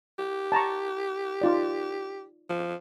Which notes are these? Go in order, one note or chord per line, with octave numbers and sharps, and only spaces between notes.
G4
A5 A#5 C#6
D#4 F4 D5
F3